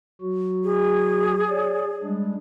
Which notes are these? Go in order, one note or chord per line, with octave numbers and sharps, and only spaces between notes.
F#3 F#4
G#4
C#5 D5
G3 G#3 D4